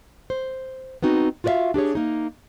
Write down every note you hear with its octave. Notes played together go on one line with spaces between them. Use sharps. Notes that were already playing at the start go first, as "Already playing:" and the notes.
C5
B3 C4 D#4 F#4
F4 F#4 B4 D5 E5 F5
D4 G4 G#4 C#5
A#3 D#4